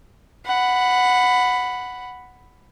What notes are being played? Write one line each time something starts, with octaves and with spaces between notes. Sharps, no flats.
F#5 B5